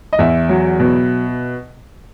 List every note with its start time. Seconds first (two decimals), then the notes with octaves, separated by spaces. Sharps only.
0.13 D#5
0.19 E2 E5
0.49 F#3
0.80 B2